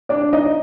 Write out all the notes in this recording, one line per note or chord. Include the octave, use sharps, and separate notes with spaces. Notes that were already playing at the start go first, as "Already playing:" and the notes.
D4 D5
D#4 D#5